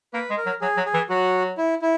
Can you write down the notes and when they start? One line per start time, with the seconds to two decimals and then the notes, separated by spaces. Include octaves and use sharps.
0.13 A#3 B4
0.30 G#3
0.37 A#4
0.46 F#3
0.61 F#3 G#4
0.77 F#3
0.86 G#4
0.94 E3
1.09 F#3 F#4
1.58 E4
1.82 E4